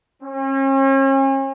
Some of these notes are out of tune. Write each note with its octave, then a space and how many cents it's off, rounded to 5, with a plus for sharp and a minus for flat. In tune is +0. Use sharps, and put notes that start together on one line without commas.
C#4 -40